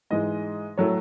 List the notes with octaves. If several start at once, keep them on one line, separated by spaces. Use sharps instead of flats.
G#2 E3 G#3 D#5
A2 F#3 A3 C#5